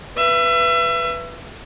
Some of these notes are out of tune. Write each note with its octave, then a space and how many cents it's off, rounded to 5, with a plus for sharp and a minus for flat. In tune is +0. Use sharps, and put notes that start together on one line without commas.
B4 +0 E5 +30